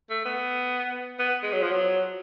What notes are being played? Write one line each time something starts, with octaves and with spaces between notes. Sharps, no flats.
A3
B3
B3
G#3
F#3
F3
F#3